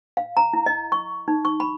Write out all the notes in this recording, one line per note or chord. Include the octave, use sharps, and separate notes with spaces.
F5
A#5
E4
D#5
C#6
D#4
C#6
B5